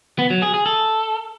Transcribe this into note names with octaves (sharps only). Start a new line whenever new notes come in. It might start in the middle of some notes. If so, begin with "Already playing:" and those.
B3
F#3
G#4
G#4
A4